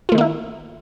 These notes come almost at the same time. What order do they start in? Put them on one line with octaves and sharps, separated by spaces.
F4 A3 D#3 A#3 E4